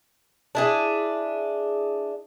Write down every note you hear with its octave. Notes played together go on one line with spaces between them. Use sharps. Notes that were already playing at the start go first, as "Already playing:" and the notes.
D4 E4 G#4